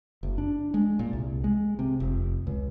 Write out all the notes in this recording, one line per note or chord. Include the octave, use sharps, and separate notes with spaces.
F#1
D4
G#3
A#2
C2
G#3
C3
F1
C#2